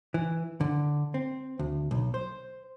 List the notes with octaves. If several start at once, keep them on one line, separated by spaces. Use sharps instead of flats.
E3
D3
C4
D2
B1
C5